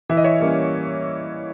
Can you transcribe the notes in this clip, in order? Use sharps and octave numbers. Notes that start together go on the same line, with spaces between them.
E3 E5
D#5
C#5 E5
G3 A#3 C#4